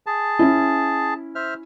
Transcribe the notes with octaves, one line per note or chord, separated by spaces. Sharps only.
G#4 A5
C#4 E4
C5 E5 F6